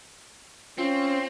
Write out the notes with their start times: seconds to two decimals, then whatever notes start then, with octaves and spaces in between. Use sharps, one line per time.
0.78 C4 C#4 F4